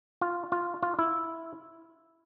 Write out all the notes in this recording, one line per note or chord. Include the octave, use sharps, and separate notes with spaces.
F4
F4
F4
E4